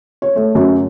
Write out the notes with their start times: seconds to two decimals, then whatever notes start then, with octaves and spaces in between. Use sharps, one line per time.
0.22 C#5
0.36 A3
0.55 F#2